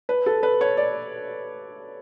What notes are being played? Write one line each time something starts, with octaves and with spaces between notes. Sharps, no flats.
B4
A4
B4
C#5
D5